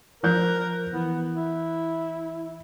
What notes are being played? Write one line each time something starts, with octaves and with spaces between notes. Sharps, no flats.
F3 A#4 F#6 G6
E3 B3
E4